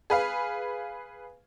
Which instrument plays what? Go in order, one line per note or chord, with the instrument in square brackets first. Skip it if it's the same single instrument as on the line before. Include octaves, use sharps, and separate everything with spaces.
[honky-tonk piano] G#4 B4 F5